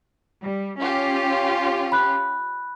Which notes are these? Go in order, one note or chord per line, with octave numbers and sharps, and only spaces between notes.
G3
C#4 F4 G4
B5 F#6